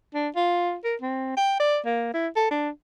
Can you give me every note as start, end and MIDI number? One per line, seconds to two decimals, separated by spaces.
0.14 0.29 62
0.36 0.75 65
0.84 0.95 70
1.01 1.36 60
1.37 1.59 79
1.60 1.79 74
1.85 2.14 58
2.14 2.28 64
2.36 2.49 69
2.51 2.69 62